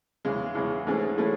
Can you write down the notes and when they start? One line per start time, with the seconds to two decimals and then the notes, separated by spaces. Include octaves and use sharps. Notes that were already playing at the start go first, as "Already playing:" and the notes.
0.25 E2 C#3 G#3
0.55 E2 C#3 G#3
0.87 G#2 E3 A3 C#4 G#4
1.17 E3 A3 C#4 G#4